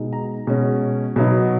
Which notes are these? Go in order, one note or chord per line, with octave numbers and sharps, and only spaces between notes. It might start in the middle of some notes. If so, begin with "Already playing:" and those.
Already playing: B2 G#3 D#4
A#5
B2 G#3 C#4
B2 F#3 B3 D#4